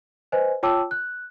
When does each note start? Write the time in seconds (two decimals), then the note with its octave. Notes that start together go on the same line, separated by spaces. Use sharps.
0.32 B4 C5 D#5 G#5
0.63 F4 C#5 G5 A5 D6 E6
0.91 F#6